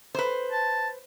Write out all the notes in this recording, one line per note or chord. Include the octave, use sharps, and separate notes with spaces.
B4 C5
A5